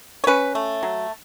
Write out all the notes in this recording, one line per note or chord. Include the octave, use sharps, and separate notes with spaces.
C#5
C#4 B4
A3
F#3